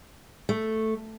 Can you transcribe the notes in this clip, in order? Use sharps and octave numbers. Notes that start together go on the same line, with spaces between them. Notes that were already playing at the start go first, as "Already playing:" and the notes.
A3